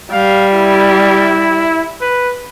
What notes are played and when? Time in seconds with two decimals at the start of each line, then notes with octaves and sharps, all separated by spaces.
0.13 G3 F5
0.53 E4
2.01 B4